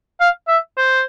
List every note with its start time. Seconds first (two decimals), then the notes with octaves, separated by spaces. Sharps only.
0.20 F5
0.48 E5
0.77 C5